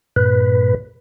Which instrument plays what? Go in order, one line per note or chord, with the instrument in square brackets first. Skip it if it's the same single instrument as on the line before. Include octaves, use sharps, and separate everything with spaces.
[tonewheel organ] G2 A#2 B4